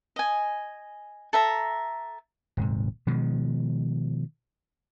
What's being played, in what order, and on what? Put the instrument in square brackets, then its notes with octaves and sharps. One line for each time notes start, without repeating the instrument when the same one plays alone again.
[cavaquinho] D#5 G#5
A4 E5 A#5
[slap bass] D#1 G#2 C3
B2 D#3 F3 G#3